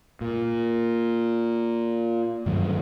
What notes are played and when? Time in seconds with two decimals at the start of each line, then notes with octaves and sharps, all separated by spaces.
0.21 A#2
2.46 G2 D#3 F#3 A3